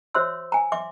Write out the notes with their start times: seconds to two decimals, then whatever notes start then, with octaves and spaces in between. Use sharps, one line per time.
0.14 F#4 C5 C#5 E5 C6 E6
0.52 G#5 A#5
0.72 E5 C6 D6